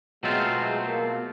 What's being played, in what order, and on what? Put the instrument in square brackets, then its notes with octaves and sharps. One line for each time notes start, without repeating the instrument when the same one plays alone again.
[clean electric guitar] B2 F#3 A3 C4 F4 [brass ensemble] G#3
[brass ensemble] G#3
A#3